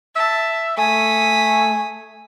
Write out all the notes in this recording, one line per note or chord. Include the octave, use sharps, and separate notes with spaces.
E5 A5
A3 G#5 D#6 B6